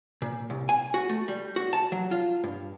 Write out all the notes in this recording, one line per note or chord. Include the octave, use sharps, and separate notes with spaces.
A#2
C2
G#5
F#4
A3
G3
F#4
A5
F#3
F4
G2